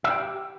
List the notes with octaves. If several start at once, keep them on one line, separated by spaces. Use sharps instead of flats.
E5
G5
G4